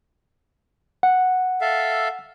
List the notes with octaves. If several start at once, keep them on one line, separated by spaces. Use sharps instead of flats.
F#5
A4 E5 F5